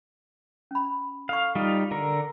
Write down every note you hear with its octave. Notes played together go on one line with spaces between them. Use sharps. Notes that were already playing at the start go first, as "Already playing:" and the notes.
C#4 B5
A4 F5 C#6
G3 D#4 F4
D3 A#4